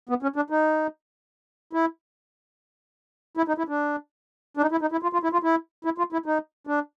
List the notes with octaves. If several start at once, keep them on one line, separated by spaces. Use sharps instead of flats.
B3
C#4
D4
D#4
E4
E4
D#4
E4
D4
D4
D#4
E4
D#4
E4
F4
F4
E4
F4
E4
E4
F4
E4
D#4
D4